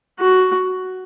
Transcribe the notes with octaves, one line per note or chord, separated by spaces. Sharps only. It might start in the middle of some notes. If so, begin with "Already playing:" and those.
F#4